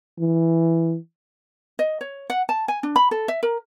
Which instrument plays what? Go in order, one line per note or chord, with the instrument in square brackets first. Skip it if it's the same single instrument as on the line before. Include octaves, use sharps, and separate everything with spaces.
[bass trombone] E3
[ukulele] D#5
C#5
F#5
A5
G#5
D4
B5
A4
E5
A#4